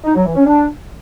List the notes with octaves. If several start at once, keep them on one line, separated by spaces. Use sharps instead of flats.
D#4
F#3
E3
C#4
D4